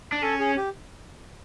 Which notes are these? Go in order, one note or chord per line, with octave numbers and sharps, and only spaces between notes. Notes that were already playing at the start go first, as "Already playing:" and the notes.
D4
C#4 A4
G#4
G4